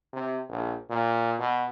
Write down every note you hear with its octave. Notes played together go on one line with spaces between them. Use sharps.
C3
A#1
A#2
B2